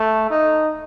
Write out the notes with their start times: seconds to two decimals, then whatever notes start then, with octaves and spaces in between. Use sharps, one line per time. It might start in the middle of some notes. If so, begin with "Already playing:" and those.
Already playing: A3
0.30 D#4